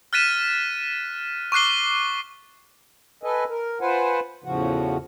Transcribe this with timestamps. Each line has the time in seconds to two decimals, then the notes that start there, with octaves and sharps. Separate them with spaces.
0.13 F6 F#6 A6 B6 D#7 E7
1.52 C#6 D6 F#6 C7 G7
3.23 A4 B4 D#5 G#5
3.49 A#4
3.81 F4 B4 C5 F#5 G#5
4.44 E2 A2 C#3 F3 F#4